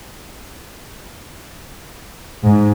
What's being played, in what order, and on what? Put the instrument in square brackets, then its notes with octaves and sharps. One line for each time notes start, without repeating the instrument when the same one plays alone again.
[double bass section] G#2